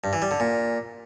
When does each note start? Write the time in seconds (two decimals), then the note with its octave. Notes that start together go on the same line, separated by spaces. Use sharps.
0.04 G2
0.13 E3
0.22 G3
0.31 D3
0.40 A#2